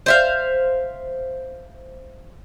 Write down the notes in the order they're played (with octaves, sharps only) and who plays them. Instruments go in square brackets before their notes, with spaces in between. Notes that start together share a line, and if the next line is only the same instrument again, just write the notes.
[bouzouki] C5 E5 F5